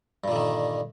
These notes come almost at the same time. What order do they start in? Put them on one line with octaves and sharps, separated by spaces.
G2 A#2 D3 D#3